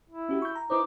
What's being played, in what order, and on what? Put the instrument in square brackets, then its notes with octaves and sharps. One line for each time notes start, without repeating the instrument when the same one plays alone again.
[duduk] E4
[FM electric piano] C#4 F#4 G4
C#6 G6
A#5
[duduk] D#4 [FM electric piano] E4 B4 C5 [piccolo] D6